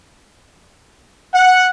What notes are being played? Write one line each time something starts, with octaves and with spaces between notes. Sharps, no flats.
F#5